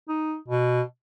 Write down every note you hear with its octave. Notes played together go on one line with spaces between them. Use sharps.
D#4
B2